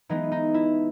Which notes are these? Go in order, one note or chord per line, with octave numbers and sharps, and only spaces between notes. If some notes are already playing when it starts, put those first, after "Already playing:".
E3 G#3 B3 D#4
D#4
E4